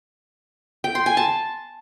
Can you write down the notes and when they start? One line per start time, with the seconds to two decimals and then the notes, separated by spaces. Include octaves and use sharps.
0.84 G5
0.95 C6
1.06 G#5
1.17 A5